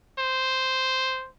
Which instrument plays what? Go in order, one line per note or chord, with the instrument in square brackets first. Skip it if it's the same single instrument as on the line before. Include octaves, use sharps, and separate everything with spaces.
[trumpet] C5